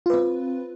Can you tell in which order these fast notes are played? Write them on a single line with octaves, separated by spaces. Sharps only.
F4 B4 C4